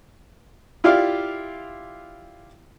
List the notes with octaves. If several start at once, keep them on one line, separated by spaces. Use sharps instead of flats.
E4 F4 G4 D5 F5